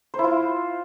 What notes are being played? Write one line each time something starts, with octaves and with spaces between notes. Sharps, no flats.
C5
E4
F4